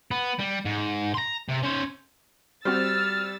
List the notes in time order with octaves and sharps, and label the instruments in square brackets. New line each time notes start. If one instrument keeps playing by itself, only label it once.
[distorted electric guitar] B3
G3
G#2
A#5 C6
C3
C#4 C5
[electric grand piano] G3 [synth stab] C4 F#4 C5 [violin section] E6 A6 [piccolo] F6